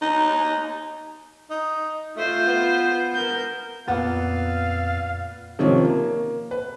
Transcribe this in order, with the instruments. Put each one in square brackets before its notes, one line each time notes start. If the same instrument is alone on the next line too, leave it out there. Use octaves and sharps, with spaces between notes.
[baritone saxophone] D#4
[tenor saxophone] D#4
[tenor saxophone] A3 [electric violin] F4 C5
[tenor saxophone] B3
[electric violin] A#4 G6
[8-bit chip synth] F2 A6 [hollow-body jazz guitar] A#2 B3 F#5 [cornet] F5
[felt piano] C3 D#3 F3 C#4
A#3
B4